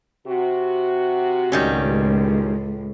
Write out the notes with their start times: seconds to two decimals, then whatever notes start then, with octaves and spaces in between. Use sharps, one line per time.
0.27 C3 F#4
1.52 C#2 A2 D#3 G3 C#4